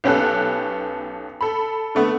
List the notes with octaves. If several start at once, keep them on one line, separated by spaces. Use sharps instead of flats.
B1 B3 C#4 G4 A4 F#6
A4 B5
D3 A3 B3